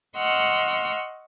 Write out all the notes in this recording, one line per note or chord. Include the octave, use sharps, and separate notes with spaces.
D#5 F#5 C6 C#6 E6 F6